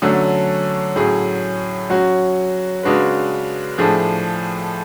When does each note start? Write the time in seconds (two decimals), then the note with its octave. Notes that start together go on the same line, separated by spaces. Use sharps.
0.02 D3 F#3 A3 C#4
0.96 A2 F#3 C#4 G#4
1.90 F#3 C#4 F#4
2.83 C#3 G#3 D4 F#4 B4
3.78 A2 F3 A3 D4 G#4